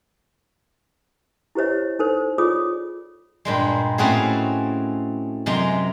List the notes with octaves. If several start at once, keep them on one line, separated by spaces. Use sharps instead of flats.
E4 G4 C5 C#5 D#5
D#4 A4 C5
F4 G#4 C#5 D5 D6 D#6
G2 A#2 G#3
A2 A3 C4 C#4 F#4 G#4
F#2 C3 G#3 A#5 C6